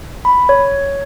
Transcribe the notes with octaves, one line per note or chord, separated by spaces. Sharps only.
B5
C#5